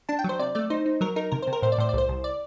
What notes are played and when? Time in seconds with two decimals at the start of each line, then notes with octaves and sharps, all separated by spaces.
0.09 D4 A5
0.19 G5
0.24 F#3 C5
0.39 C3 D5
0.55 A3 D5
0.70 D#4 C5
0.86 D#4
1.01 F#3 A#4
1.16 D#4 A#4
1.32 C3 A#4
1.42 C5
1.47 C3
1.53 A#4
1.62 A2 C5
1.72 D5
1.78 A2 C5
1.89 D5
1.93 C2 C5
2.09 C2
2.24 D5